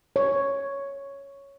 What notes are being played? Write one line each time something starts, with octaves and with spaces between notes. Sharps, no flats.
C#5